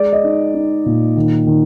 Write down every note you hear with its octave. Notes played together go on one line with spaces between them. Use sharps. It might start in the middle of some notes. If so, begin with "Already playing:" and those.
Already playing: G#3 D5
D#5
D#4
D#4
A#2
D#3
D#3